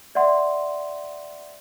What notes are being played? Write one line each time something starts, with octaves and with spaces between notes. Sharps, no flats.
D5 E5 F#5 C6